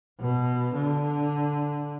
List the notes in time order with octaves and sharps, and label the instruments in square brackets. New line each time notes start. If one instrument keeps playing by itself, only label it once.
[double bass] B2
D3